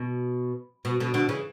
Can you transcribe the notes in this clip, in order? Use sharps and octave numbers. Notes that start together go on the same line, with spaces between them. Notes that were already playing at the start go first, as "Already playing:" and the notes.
Already playing: B2
B2
B2 D3
B2 D3
C#3 E3